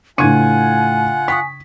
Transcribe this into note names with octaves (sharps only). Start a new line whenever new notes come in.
A2 C#3 D4 F4 F#5 G#5 G#6 D#7
G5 C#6 D#6 B6